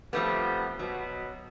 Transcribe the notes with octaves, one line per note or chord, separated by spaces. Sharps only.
C3 F3 G3 A3 B3
B2 F#3